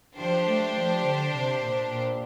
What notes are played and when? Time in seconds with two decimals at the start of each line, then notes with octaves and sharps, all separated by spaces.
0.17 F3 D4 G4 C5
0.46 A3
0.75 F3
1.04 D3
1.33 C3
1.61 A#2
1.90 A#2